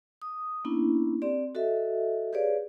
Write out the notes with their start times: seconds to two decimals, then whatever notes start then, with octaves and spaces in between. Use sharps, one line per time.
0.22 D#6
0.65 A#3 B3 C#4 D4 E4
1.22 C4 G4 D5
1.55 F#4 A4 D#5 E5
2.33 G4 G#4 B4 C#5 D5 F5